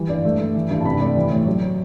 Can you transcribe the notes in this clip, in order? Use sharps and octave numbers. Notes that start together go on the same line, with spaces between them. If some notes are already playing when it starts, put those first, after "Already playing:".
Already playing: E3 G3
G2 D5
A3
A3
E3
G2
A5
C3 B5
A3 D5
E3
A2
F#3